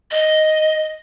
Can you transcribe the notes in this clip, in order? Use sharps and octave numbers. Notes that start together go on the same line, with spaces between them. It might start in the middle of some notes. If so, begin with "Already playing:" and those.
D#5